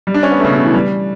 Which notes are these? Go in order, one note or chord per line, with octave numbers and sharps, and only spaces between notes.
G3
D4
C#4
B3
A3
C#3
B2
C#3
E3
G3